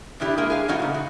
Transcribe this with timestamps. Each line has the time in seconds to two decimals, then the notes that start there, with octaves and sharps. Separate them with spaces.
0.20 B2 E3 D4 E4 G4
0.38 G#3 A#3 E4 A#4
0.50 G#4 F5
0.68 G2 E3 A3 C#4 D#4 F#4
0.79 A#2 C#3
0.94 F#4